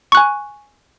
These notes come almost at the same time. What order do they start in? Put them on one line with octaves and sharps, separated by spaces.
C#6 F#6 G#5